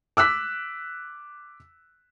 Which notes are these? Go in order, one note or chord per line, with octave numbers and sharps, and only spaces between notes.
D6 E6 F#6 B6